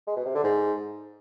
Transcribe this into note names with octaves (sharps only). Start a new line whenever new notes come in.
G#3
B2
C3
D3
G#2